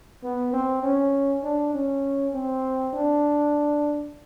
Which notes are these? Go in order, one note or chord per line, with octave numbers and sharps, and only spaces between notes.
B3
C4
C#4
D4
C#4
C4
D4